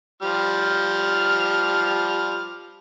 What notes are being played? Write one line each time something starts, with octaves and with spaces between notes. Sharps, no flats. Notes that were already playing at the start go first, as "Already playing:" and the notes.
F3 G3 F6